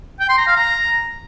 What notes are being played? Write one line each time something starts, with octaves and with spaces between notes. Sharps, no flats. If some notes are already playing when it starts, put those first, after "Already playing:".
G5
C6
A#5
F5
A#5